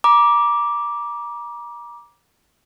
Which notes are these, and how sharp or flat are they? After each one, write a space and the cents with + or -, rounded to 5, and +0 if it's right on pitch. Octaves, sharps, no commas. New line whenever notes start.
A#5 +35 D6 +0